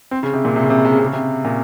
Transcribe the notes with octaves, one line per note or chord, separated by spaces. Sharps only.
C4
C#3
C3
A#2
C3
C#3
C3
C#3
C3
C#3
C3
C#3
C3
A#2